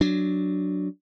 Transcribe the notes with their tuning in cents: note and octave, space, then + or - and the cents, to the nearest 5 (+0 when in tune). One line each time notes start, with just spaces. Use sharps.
F#3 +0 D4 +0